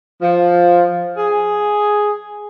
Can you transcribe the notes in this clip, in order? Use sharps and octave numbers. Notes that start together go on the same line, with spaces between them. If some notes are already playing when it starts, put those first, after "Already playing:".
F3
G#4